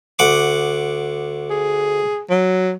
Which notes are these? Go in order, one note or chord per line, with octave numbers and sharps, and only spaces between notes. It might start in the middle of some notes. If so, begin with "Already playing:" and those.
D2 F#5 D6
G#4
F#3